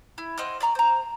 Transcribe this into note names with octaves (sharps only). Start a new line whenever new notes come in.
E4
C4 D#5 F#5 F6
D5 E5 A#5 C#6
C5 A#5